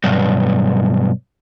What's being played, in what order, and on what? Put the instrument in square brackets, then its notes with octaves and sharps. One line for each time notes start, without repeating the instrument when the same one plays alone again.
[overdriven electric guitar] B1 G2